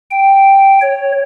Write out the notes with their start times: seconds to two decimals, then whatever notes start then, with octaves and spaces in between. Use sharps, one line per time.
0.11 G5
0.82 C#5